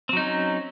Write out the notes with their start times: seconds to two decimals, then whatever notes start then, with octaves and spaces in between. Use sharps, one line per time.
0.09 C4
0.13 F#3
0.17 D#4
0.21 C#4